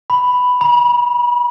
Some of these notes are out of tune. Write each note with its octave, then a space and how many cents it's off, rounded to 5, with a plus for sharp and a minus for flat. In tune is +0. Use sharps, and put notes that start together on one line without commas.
B5 +5
B5 -35